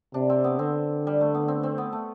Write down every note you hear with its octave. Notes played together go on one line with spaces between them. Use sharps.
C3 D4
C4
B3
D3 C4
G3
A3
B3
C4
C4
B3
A3